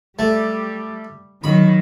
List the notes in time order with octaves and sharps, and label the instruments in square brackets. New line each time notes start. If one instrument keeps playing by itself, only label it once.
[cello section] G3 [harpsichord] A3
[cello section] D#3 F#3 [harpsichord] B5